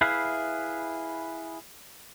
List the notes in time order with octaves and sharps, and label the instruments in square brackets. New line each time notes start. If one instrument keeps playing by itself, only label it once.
[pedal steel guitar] E4 G#4 B4 E5 F5